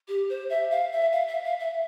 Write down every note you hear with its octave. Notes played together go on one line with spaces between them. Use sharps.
G4
C5
E5
F5
E5
F5
E5
F5
E5